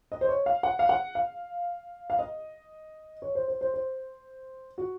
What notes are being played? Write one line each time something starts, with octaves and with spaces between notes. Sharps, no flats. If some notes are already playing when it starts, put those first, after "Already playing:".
D#5
C5
C#5
F5
F#5
F5
F#5
F5
F5
D#5
C#5
C5
C5
C5
C5
F#4